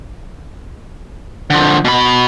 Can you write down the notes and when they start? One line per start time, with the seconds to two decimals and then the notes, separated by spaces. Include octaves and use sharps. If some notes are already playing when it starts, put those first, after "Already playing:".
1.50 D3 F3
1.85 B2 B5